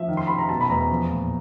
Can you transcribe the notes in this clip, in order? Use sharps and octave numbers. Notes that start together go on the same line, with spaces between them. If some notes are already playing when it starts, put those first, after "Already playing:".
Already playing: F3 E5
D#3
C6
C3 B5
A#5
B2 A5
B5
E2 A#5
F3
A#2